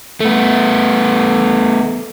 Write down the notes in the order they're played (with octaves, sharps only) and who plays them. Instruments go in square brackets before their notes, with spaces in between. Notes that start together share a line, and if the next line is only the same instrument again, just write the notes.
[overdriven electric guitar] A3 B3